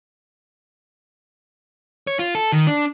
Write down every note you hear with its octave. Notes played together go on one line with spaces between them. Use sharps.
C#5
F4
A4
D#3
D4